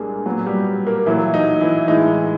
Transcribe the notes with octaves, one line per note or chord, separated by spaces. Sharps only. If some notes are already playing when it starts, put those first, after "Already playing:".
Already playing: C2 A#2 G3 G#3 A#3 D4 G#4
A#2 F#3 B3 F#4
G3 G4
A#3 A#4
A#2 E3 F#3 A3 E4
D#4
E3 E4
A2 E3 G#3 D#4
D#4